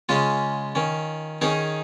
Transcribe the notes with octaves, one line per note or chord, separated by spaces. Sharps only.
C#3 G#3 C#4 F4
D#3 C#4
D#3 C#4 D#4 G#4